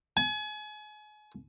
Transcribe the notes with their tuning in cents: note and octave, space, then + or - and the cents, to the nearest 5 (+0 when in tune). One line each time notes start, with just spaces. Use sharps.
G#5 +35